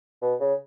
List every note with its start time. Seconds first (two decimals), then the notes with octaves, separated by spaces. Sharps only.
0.22 B2
0.40 C#3